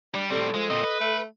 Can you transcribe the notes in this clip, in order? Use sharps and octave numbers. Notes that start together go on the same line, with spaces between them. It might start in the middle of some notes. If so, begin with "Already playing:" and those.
G3 D4
A2 G3 C4 A4
F3 G#3
A#2 C4 D#5
B4
A3